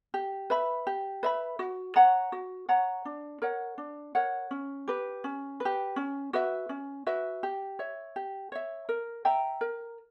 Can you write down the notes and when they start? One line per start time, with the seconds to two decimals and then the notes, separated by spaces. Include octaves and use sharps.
0.14 G4
0.50 B4 E5 B5
0.87 G4
1.23 B4 E5 B5
1.59 F#4
1.96 C#5 F#5 A#5
2.32 F#4
2.69 C#5 F#5 A#5
3.05 D4
3.42 A#4 C#5 F#5
3.78 D4
4.15 A#4 C#5 F#5
4.51 C#4
4.88 G4 B4
5.24 C#4
5.60 B4
5.65 G4
5.96 C#4
6.33 F#4 B4 E5
6.69 C#4
7.06 F#4 B4 E5
7.43 G4
7.79 C#5 E5
8.16 G4
8.52 C#5 E5
8.89 A#4
9.25 E5 G5 A#5
9.61 A#4